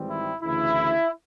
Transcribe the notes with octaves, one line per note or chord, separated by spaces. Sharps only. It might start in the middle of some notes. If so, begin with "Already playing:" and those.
Already playing: G#1 G#2 E3 G3 C4
E4
D2 C#3 E3 E4